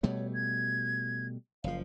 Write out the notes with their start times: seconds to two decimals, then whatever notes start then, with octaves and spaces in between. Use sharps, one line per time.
0.03 B2 G3 A3 C#5
0.34 G#6
1.64 F#1 F3 F5